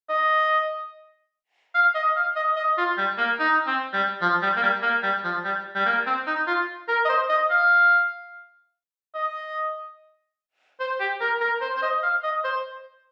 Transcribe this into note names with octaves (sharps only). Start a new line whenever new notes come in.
D#5
F5
D#5
F5
D#5
D#5
F4
G3
A#3
D#4
C4
G3
F3
G3
A#3
G3
A#3
G3
F3
G3
G3
A#3
C4
D#4
F4
A#4
D#5
C5
D#5
F5
D#5
C5
G4
A#4
A#4
C5
C5
D#5
F5
D#5
C5